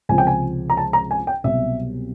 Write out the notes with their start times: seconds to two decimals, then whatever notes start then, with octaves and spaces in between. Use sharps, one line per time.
0.09 C#2 C3 F3 G#5
0.18 G5
0.27 G#5
0.70 A#5
0.77 A5
0.93 A#5
1.11 G#5
1.27 G5
1.44 C2 B2 F#3 E5